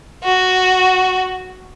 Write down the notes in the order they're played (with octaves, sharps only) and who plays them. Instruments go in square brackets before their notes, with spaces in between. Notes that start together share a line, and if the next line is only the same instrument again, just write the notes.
[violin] F#4